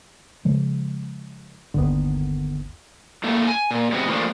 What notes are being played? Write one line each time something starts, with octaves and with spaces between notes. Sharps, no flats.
C#3 F3 G#3
G1 D#2 D3 D#3 B3
A2 A3 A#3
G#5
A#2
C3 G3 G#3 B3 F#4
E3 F3 A3 A#3 D4